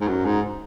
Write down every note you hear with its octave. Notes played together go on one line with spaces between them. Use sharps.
G#2
F#2
G#2